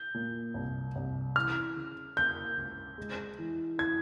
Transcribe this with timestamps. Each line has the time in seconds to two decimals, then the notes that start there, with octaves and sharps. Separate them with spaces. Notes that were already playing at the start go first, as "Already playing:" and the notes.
Already playing: G6
0.14 A#2
0.54 C2
0.96 C2
1.36 E3 F6
1.76 C#3
2.16 A#3 G6
2.57 C#2
2.98 G#3
3.39 E3
3.78 E4 G#6